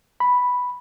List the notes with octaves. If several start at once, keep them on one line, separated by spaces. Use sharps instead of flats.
B5